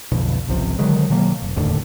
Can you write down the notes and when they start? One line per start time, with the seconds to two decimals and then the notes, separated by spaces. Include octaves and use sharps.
0.12 B1 F2 B2 D3
0.48 G#1 C#2 C3 F3
0.79 D3 D#3 F#3 G#3
1.10 B2 D#3 F#3 A#3
1.42 F1
1.56 F1 D#2 A2 D3